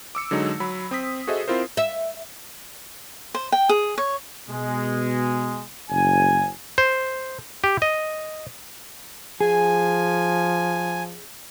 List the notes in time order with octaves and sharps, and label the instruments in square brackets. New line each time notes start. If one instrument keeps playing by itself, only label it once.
[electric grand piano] D6 E6 C#7
D3 F#3 G#3 D#4
F#3 B5
C4 D#6 B6
F#4 G#4 A4 C5 D#5 E5
C4 E4 F4 A#4 C5
[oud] E5
[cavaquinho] C5
G5
G#4
C#5
[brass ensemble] B2 G#3
F#1 G#5
[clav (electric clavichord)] C5
G4
D#5
[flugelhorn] F3 [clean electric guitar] G#4 [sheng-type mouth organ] G#5